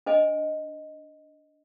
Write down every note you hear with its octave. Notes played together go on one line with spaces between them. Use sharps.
D4 C5 D#5 G#5